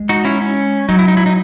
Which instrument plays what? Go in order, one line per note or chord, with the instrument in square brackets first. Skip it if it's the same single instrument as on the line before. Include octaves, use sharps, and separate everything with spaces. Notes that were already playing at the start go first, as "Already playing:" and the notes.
Already playing: [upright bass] G#3
[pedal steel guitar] D#4 F#4
C#4 E4
C#4
[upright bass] F#3 [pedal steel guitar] D#4
[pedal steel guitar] E4
D#4
E4
D#4